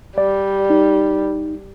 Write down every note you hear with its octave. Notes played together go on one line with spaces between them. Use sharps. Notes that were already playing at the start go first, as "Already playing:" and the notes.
G3 D5
D#4